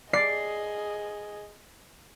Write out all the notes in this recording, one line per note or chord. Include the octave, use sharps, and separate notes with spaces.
G#4 D5 D#5 C7